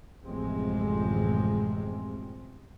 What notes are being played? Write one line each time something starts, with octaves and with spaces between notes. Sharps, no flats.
A1 F#2 C3 F3 G#3 C4